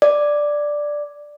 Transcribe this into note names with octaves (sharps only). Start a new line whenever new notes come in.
D5